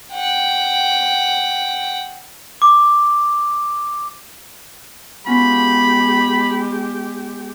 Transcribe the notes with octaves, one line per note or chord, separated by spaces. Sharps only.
F#5 G5
D6
G#3 B3 C#4 F4 G4 B5